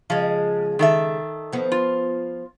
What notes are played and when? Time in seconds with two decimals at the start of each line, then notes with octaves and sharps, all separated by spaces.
0.10 C#3 F3 G#3
0.79 D#3 A4 E5
1.53 F3 B3
1.72 F4